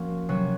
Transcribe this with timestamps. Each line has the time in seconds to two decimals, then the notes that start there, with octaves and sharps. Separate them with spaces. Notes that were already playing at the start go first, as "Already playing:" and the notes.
Already playing: F3 A#3 C#4 F#4
0.29 C3 F#3 C#4 F#4